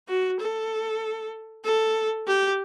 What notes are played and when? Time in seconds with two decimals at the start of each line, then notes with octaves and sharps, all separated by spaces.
0.08 F#4
0.40 A4
1.64 A4
2.27 G4